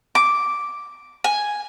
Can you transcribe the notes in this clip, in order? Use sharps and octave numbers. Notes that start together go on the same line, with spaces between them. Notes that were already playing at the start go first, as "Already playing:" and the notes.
D6
G#5